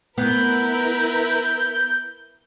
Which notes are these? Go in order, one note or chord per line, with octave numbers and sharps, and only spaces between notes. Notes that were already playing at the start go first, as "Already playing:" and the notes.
B3 E4 A#4 B4 G6